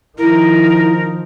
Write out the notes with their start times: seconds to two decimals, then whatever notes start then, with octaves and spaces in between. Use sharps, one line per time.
0.18 D#3 F3 E4 A#4